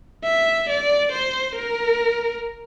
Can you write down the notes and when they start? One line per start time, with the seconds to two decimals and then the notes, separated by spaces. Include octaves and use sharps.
0.24 E5
0.69 D5
1.13 C5
1.55 A#4